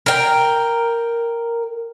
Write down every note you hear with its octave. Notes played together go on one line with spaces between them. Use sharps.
A#4 G5